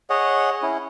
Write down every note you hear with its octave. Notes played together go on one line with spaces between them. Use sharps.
G#4 C#5 D#5 F#5
C#4 E4